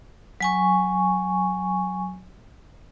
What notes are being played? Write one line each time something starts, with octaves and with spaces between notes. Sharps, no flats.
F#3 G#5 C#6